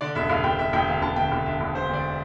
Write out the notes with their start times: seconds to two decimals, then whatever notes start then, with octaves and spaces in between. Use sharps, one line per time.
0.01 D3 D5
0.15 E1 E5
0.30 E1 F5
0.44 E1 G5
0.59 E1 E5
0.73 E1 G5
0.88 D2 F5
1.02 E1 A5
1.16 D2 G5
1.32 E1
1.45 D3 E5
1.61 E1
1.75 D3 C5
1.89 D2 D5